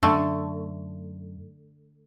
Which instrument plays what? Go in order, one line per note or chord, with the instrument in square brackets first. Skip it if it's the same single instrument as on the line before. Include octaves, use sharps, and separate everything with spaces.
[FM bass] F#2 [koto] D3 A3